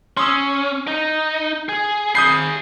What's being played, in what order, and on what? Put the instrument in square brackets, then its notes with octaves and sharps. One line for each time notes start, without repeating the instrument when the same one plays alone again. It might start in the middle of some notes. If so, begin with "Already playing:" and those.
[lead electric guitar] C#4 [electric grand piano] C6 D#6 E6
[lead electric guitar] D#4
G#4
[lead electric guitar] G#4 B5 [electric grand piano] D#6 G6 C7